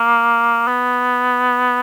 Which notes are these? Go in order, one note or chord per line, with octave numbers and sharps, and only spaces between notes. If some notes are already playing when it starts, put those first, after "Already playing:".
Already playing: A#3
B3